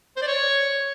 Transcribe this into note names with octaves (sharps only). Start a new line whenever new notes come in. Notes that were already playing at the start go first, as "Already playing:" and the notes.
C5
D5
C#5